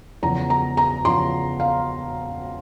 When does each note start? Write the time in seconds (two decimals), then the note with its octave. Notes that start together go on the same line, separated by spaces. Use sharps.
0.23 E2 C#3 F3 A#5
0.50 A#5
0.77 A#5
1.05 E2 C#3 F3 C6
1.60 F5